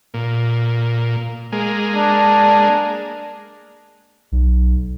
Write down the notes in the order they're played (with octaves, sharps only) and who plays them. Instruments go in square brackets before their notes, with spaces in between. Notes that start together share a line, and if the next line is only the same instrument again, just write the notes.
[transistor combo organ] A#2
G#3 A#3
[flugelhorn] D4
[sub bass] B1